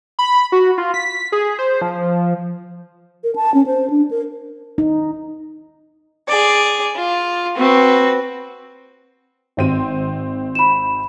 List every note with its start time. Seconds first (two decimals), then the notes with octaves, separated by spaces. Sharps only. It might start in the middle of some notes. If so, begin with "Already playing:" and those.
0.19 B5
0.52 F#4
0.78 F4
0.94 B6
1.32 G#4
1.59 C5
1.81 F3
3.24 A#4
3.36 A5
3.54 C#4
3.66 C5
3.90 D4
4.11 A#4
4.78 D#4
6.27 G#4 D5
6.96 F4
7.57 C4 F#4 B4
9.57 G#1 C4 D#7
10.55 B5 E7